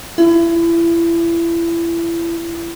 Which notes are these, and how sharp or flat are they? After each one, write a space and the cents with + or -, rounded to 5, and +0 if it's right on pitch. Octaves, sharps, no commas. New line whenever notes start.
E4 +30